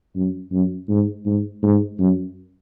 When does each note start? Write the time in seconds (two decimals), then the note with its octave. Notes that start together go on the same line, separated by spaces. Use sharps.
0.16 F#2
0.52 F#2
0.89 G#2
1.26 G#2
1.63 G#2
1.99 F#2